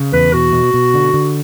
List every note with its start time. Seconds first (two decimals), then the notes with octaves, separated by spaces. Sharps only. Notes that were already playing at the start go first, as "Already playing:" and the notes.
Already playing: C#3
0.13 E2 B4
0.33 B2 F#4
0.53 B2
0.74 B2
0.94 D3
1.14 D3